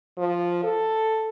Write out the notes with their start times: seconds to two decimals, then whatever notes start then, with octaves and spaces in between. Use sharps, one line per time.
0.18 F3
0.64 A4